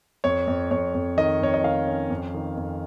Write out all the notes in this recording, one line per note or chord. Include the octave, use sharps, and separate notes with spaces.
F2 C#5
F2
F2 C#5
F2
D#3 D#5
F2 C#5
D#5
D#3 F5
C#4
F2
D#3
F2